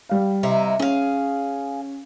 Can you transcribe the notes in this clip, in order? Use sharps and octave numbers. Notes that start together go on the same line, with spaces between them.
G3 F5
C3 D#4 E4
C#4 G#4 F5